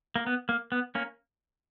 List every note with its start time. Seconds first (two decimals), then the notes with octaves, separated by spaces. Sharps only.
0.16 A#3
0.27 B3
0.49 A#3
0.72 B3
0.95 A#3 C#4